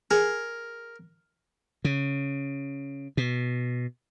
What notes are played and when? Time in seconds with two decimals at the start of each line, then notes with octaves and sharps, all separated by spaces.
0.11 G#4 A#4
1.85 C#3
3.17 B2